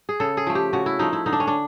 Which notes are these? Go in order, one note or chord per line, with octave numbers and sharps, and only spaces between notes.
G#4
C#3 A4
G#4
F3 A3
G4
C#3 F#4
E4
F3 A3 D#4
E4
D3 D#4
D4
C#4
D4